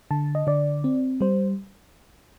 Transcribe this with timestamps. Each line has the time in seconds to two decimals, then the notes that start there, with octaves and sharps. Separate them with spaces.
0.11 D3 A5
0.35 D#5
0.47 D3 D5
0.84 C4
1.21 G3 C5